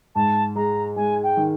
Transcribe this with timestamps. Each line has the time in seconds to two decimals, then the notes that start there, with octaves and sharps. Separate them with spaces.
0.15 G#2 A5
0.56 G#3 A#5
0.96 G#3 G#5
1.23 G5
1.37 D#3